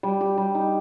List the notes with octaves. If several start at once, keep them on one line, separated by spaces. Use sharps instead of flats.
G3
G4
G3
D#4